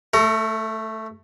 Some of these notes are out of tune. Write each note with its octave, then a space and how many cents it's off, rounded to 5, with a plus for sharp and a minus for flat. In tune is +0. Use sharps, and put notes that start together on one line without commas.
A3 +0 A4 +40 A#5 +0